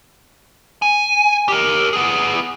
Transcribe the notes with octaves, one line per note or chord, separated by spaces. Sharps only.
G#5
G4 A#4
B3 G#4